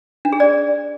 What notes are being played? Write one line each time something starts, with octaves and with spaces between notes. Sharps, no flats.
D4
G#4
D5